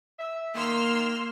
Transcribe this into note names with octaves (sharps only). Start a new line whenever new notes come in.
E5
D#3 A#3 C6 E6 F6